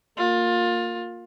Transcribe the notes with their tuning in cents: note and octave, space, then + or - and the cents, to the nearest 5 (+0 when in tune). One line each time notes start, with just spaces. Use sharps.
A#3 -10 F4 +20